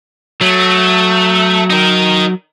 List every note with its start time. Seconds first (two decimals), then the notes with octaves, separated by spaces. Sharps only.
0.41 F#3 A3
1.70 D#4 A#4